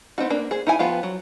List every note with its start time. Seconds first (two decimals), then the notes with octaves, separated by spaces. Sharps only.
0.18 B3 C4 D#4 F#4
0.30 A#3 D4
0.51 G#4 C5
0.67 D#4 E4 G#5
0.79 F3 B3 F4 G4
1.03 F#3